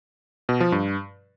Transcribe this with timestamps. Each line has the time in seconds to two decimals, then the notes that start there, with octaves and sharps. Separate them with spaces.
0.49 B2
0.60 F3
0.72 G2